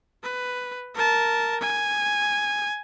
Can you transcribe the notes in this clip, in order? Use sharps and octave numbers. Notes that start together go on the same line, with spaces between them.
B4
A#4 A5
G#5